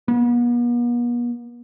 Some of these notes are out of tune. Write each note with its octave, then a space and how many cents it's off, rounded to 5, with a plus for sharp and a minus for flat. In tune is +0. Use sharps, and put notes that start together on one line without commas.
B3 -45